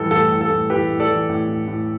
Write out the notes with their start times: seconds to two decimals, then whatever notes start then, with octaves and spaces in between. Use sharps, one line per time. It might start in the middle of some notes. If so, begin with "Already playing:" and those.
Already playing: A2 E3 G3 A4
0.11 A2 A4
0.31 A2
0.41 A4
0.50 A2
0.70 E3 G4 B4
0.90 A2
1.00 A4 D5
1.09 E3
1.29 A2
1.48 A2
1.68 A2